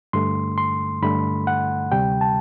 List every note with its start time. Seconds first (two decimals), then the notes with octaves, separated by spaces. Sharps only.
0.13 G2 D3 A3 C6
0.58 C6
1.02 G2 D3 A3 B5
1.47 F#5
1.92 D2 C3 G3 G5
2.21 A5